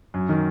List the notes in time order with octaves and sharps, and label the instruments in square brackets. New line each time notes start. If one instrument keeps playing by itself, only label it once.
[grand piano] F#2
D#3